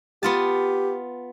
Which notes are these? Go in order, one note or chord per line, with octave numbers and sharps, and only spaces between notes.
B3 F4 G4 A5